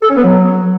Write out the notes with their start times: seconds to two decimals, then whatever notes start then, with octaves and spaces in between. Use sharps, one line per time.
0.02 A4
0.09 C#4
0.16 B3
0.23 F#3